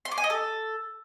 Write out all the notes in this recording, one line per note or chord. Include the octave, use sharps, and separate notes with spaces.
C6
D6
G#5
D#5
A4